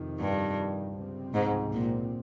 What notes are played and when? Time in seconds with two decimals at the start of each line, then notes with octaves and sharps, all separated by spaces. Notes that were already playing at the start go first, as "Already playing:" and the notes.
Already playing: F2 C3 D#3
0.20 G2
0.96 C#2 C3 F3 C4
1.34 G#2
1.73 A#2